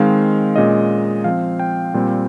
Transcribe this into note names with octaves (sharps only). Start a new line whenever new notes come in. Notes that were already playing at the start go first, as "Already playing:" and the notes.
Already playing: D#3 G#3 C4 F5
A#2 G#3 C#4 D#5
F3 C4 F5
G5
A#2 G3 C4